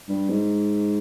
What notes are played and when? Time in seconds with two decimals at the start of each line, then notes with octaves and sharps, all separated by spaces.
0.09 G2
0.30 G#2